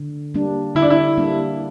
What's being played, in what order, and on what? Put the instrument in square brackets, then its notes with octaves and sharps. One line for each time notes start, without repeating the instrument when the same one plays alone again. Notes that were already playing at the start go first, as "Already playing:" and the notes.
Already playing: [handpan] D3
G3 A#3 D4
[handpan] D3 [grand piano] E4
[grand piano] D4
E4
[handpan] G3 A#3 D4